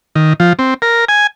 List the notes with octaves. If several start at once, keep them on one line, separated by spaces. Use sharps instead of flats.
D#3
F3
C4
A#4
G#5